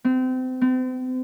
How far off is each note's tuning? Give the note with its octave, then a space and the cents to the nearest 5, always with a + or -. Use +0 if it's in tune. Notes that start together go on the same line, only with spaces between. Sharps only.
C4 -30
C4 -40